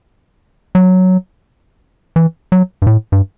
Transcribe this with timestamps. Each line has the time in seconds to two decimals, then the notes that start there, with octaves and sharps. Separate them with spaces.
0.75 F#3
2.16 E3
2.52 F#3
2.82 G2
2.87 A2
3.12 G2